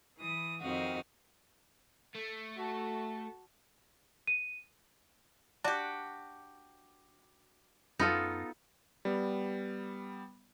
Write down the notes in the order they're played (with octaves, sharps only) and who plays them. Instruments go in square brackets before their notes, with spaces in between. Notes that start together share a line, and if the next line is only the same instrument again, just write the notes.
[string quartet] E3 D#6
F2 D#3 C4 F#4 F5 D#6
[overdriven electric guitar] A3
[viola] F#4 A5
[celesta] D#7
[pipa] D4 G4 [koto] F#4
[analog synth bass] F#2 [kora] B3 F4 A4 [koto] D#4
[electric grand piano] G3 B3